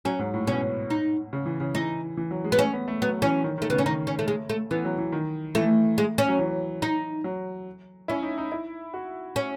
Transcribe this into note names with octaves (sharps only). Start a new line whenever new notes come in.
F#3 C#4
G#2
A2
B2 C#4
D#4
C#3
E3
C#3
E3 D#4
E3
F#3
G#3
B3
A3 C#4
B3
A3
F#3 B3
E3 C#4
D#3
D#3
A3
C#3 B3
C#4
D#3 D#4
C#4
A3
G#3
A3
E3 B3
F#3
E3
D#3
E3 A3
G#3
C#4
F#3
E3
D#4
F#3
C#4 E4
D#4
D#4
E4
F#4
C#4